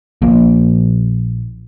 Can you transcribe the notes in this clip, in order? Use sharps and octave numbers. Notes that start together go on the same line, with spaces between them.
A#1 A#2 F3 A#3